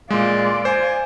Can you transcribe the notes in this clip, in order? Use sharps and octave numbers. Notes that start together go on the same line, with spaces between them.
A#2 G#3 D5 F5 C6
C5 G#5